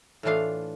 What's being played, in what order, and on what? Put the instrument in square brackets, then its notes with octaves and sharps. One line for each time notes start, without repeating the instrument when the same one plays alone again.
[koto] A2 E3 A3 D4 F4 F5